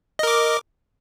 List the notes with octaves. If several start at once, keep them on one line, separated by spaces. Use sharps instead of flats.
A#4 D#5 D6